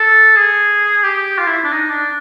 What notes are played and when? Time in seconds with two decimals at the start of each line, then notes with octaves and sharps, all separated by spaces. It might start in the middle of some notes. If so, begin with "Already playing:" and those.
Already playing: A4
0.36 G#4
1.04 G4
1.38 F4
1.47 E4
1.65 D4
1.72 D#4
1.90 D4